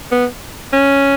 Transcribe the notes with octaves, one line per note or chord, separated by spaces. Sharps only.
B3
C#4